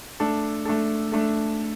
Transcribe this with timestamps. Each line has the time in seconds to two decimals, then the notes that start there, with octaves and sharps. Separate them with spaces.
0.20 A3 D4 A4
0.65 A3 D4 A4
1.12 A3 D4 A4